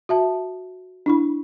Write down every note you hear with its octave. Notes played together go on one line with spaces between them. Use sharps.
F#4 E5 A5
D4 E4 B5